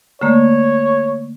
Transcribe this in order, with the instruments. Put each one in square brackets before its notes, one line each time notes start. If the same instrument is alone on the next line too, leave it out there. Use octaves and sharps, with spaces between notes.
[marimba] D3 A3 A#3 [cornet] C#5